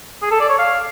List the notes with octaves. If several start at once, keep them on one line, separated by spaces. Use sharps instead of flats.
G#4
A4
D5
C#5
F5